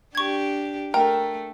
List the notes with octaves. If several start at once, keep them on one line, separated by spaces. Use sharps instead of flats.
D4 G4 C#6 G#6
A3 A#4 G5